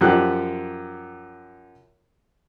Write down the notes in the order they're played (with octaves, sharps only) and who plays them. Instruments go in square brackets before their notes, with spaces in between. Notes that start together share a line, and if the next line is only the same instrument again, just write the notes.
[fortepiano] F#2 F3 G4 F#6